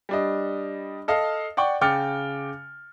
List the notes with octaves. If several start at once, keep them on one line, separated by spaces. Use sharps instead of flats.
G3 D4 D#5
A4 D#5 F5
D5 F#5 G5 C#6
C#3 G5 D6 F6 A6 C#7